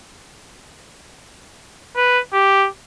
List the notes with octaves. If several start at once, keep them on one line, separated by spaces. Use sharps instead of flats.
B4
G4